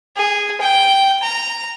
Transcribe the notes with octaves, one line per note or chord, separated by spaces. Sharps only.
G#4
G5
A#5